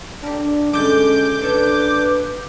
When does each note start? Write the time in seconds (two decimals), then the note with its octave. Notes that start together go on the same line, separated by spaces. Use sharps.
0.23 D4 G4 A#4
0.73 G2 D3 G#3 C#4 D6 G6
1.42 D4 A4 B4 C#5 E5